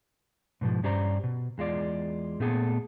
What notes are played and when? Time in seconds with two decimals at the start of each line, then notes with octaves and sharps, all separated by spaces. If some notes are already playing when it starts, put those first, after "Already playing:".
0.61 G#2 B2 F3
0.83 G2 C#4 G4 C5 D5 A#5
1.24 B2
1.58 E2 G#3 F4 D5
2.40 A#2 A3 B3 G#4 A4